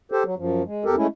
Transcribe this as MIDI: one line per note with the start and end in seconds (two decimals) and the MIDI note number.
0.12 0.23 67
0.12 0.23 69
0.12 0.23 72
0.25 0.35 54
0.38 0.63 42
0.38 0.63 53
0.66 0.84 56
0.85 0.96 40
0.85 0.96 67
0.85 0.96 69
0.85 0.96 70
0.97 1.07 56
0.97 1.07 57
0.97 1.07 61
0.97 1.07 64